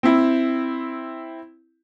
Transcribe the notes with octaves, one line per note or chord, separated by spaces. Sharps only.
C4 E4